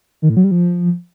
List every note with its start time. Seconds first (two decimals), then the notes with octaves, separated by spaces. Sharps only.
0.22 D#3
0.29 A2
0.37 F#3
0.44 G3
0.51 F3